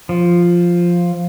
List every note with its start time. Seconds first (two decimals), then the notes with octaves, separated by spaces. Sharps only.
0.09 F3